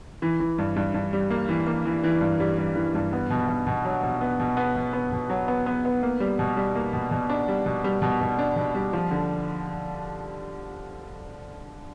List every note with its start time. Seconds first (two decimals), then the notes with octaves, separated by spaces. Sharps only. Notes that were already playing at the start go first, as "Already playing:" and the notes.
0.22 E3
0.40 E3
0.58 G2
0.76 G2
0.94 G2
1.13 G3
1.30 A#3
1.49 E3
1.67 A#3
1.85 E3
2.04 E3
2.21 G2
2.40 G3
2.58 G3
2.76 E3
2.95 G2
3.13 B3
3.30 B2
3.48 B2
3.67 B2
3.85 F#3
4.03 B2
4.21 B3
4.40 B2
4.57 B3
4.76 B2
4.93 B3
5.12 B2
5.30 F#3
5.48 B3
5.66 B3
5.85 B3
6.03 A#3
6.20 G3
6.39 B2
6.57 G3
6.75 A#3
6.93 B2
7.11 B2
7.30 D4
7.48 G3
7.66 B2
7.84 G3
8.02 B2
8.21 B2
8.39 D4
8.56 B2
8.75 G3
8.93 F3
9.11 D3